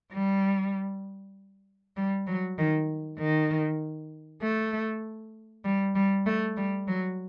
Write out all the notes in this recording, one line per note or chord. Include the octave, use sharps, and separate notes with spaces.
G3
G3
F#3
D#3
D#3
A3
G3
G3
A3
G3
F#3